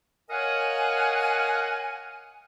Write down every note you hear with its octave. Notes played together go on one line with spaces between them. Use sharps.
A#4 C#5 D#5 F5 F#5 G#5